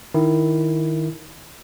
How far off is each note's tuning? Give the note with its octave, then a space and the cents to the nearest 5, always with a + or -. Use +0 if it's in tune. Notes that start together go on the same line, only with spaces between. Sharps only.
D#3 +0 E4 +0